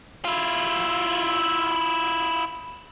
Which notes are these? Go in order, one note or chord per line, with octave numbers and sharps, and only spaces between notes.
E4 F4